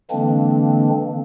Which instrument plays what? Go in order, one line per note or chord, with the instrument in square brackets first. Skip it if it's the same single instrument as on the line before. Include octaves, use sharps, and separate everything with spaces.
[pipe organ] D3 E3 G#3 A#3 C4 D4